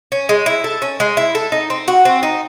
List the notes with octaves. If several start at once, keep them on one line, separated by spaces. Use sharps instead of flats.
C#4
G#3
E4
A4
C#4
G#3
E4
A4
D#4
C4
F#4
C4
D#4